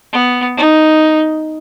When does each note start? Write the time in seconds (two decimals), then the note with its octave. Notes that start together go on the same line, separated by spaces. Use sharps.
0.12 B3
0.56 D#4